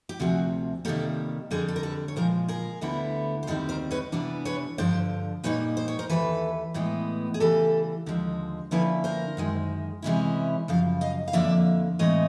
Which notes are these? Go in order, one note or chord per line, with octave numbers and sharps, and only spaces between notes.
G4
D2 C3 F3 F#4 G#4
C3 D#3 G3 A#3 G4 A4
F2 D3 G3 G#4 A#4
A4
A#4
A4 B4
C#5
A#2 F3 G#3 A#4 C5
G#4 A#4
D2 D3 G3 B3 E4
C5
D#2 D#3 G3 C4 A4 B4
A#4 C5
B4 C#5
C3 E3 G3 B3 D4
B4 C#5
G2 D3 F3 C5 D5
A#2 G3 A#3 D#4 B4 C#5
C5
C#5
A#4 C5
D#2 C#3 E3 A4 B4
A2 E3 G#3 B3
G#4
C#3 E3 G3 G4 A4
D#2 D3 F3 G#3
D3 F3 A#3 C#4 E4 A4 B4
A#4 C5
F#2 D#3 G#3
C3 E3 G#3 C#4 E4
F#2 C#3 F3 F5
D#5 F5
F5
F2 D3 F3 A#3 D5 E5
A2 E3 G#3 C4 C#5 D#5